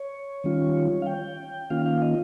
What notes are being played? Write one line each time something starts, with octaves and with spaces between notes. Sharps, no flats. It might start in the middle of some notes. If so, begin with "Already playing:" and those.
Already playing: C#5
D#3 G3 C#4 F4
F5
G5
D#3 A#3 C#4 F4 F5
F5
D#5